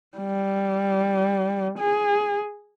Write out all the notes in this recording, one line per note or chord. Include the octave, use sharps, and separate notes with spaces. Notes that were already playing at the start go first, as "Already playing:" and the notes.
G3
G#4